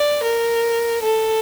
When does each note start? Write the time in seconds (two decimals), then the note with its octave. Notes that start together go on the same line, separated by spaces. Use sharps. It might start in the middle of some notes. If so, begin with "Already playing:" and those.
Already playing: D5
0.22 A#4
1.02 A4